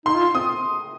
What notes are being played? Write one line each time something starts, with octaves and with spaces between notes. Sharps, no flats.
D#4 C6
F4
C4 D#6